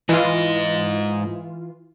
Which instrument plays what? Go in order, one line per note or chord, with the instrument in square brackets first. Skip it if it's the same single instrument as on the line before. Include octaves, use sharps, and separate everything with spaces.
[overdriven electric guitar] G#2 D#5 [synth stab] E3 F4